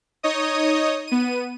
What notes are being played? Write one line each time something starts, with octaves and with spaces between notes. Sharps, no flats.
D#4 C#5 D#5 D#6
B3 D#7